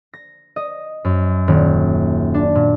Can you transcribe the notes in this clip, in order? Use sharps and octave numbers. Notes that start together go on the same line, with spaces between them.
A#6
D#5
F#2
D#1
D4
A#2